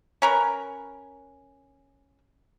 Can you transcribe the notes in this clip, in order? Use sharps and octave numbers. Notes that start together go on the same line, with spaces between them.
C#4 A#4 B4